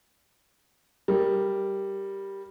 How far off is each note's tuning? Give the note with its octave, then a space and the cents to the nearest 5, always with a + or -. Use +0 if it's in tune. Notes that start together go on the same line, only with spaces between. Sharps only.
G3 +0 A#4 +0